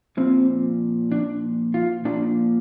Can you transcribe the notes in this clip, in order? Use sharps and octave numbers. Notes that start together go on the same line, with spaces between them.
A#2 F3 C4
D4
F4
A#2 F3 D4